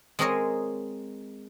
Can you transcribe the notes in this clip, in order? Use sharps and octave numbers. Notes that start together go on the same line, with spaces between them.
G#3 C4 G#4 A#4 C#5 D#5